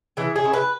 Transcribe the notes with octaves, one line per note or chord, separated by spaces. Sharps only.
E3 G#4
G#4
C#4 E4
B4